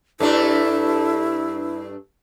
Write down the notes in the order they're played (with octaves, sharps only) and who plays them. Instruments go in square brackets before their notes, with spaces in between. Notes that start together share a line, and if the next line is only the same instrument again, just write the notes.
[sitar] G2 A3 D4 [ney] E4 [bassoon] A4